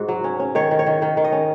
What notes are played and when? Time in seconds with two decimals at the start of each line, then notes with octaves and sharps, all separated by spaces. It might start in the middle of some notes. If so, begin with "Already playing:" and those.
Already playing: G#2 F#4
0.08 F#3
0.24 C#4
0.40 C#4
0.55 D#3 C#5
0.71 D#3
0.79 C#5
0.86 D#3
1.02 D#3
1.17 D#3
1.24 D#5
1.32 C#4